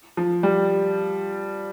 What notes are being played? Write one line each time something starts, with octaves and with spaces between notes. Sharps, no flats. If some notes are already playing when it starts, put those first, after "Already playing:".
F3
G3